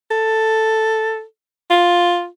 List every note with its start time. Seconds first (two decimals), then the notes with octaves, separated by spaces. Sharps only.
0.11 A4
1.70 F4